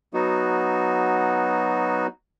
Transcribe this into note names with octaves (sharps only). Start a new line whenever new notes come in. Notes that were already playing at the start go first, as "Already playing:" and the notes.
F#3 B3 D#4 F#4